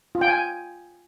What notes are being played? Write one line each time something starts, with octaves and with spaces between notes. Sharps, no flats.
F4
G5
G#5